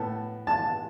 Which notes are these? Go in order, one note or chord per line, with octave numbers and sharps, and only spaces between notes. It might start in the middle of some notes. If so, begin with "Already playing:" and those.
Already playing: A2 B3 A5
A5